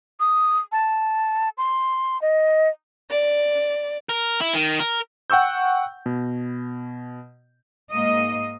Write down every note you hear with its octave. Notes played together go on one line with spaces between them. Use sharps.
D#6
A5
C6
D#5
D5
A#4
E4
D#3
A#4
F#5 G5 C#6 E6 G6
B2
G#2 A#3 D#5